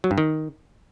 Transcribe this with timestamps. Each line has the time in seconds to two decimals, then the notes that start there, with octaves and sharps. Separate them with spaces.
0.04 F#3
0.11 G2
0.18 D#3